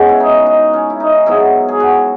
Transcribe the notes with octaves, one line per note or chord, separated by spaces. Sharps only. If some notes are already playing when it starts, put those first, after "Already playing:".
Already playing: C#3 G#3 B3 F#4
E4
D#4
D#4
C#4
E4
D#4
G#2 F#3 B3 E4
G#4
F#4